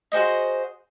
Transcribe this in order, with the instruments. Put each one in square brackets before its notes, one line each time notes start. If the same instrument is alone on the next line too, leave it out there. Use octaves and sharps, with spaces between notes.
[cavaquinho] F#4 G#4 C5 D#5